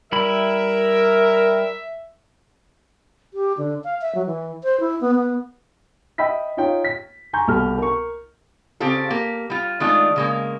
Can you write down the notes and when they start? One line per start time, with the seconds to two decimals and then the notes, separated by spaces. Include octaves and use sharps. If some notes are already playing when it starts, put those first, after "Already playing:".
0.12 G3 E4 A#4 E5 B5
3.34 G4
3.58 D3
3.84 F5
4.01 E5
4.15 F#3
4.26 E3
4.64 C5
4.80 E4
5.01 B3
5.15 B3
6.18 D#5 E5 G5 B5 E6 B6
6.57 D#4 F4 C#5 G5
6.84 B6
7.33 G#5 A#5 C6 C#6 G6
7.48 C2 B2 A4 F6
7.78 A#4 C#6
8.80 C#3 C4 F4 G4 A4
9.10 A#3 G4
9.50 G3 F4
9.80 D#3 G#3 A3 D4 D#4 F4
10.16 C#3 G#3 A#3